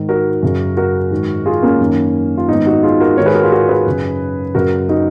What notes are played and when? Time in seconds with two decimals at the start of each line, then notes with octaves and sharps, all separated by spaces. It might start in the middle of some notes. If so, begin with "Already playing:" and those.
Already playing: G#2 D#3
0.09 F#4 A#4
0.43 F#2 C#3
0.77 F#4 A#4
1.11 G#2 D#3
1.46 F4 G#4
1.62 A#3 C#4
1.80 F#2 D#3
2.37 F4
2.48 G#2 D#3 B3 D#4
2.66 D#4 F#4
2.83 F4 G#4
3.00 F#4 A#4
3.17 G#2 D#3 A#4 C#5
3.26 G#4 B4
3.35 F#4 A#4
3.43 F4 G#4
3.52 F#4 A#4
3.69 G#4 B4
3.86 F#2 C#3
4.55 F#2 C#3 F#4 A#4
4.89 D#4 F#4